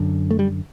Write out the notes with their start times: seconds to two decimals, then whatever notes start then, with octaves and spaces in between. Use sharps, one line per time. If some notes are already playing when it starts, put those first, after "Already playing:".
Already playing: F#2 D3
0.31 A3
0.39 G3